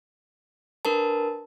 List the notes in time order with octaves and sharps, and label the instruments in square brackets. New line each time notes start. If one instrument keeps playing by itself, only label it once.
[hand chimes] D4 A#4 B4 A5